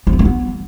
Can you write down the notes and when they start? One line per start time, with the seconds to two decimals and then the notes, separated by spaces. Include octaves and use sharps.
0.07 F3
0.13 B3
0.19 A#3
0.25 B3